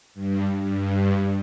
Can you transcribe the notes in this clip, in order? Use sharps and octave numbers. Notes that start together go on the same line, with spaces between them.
G2
G2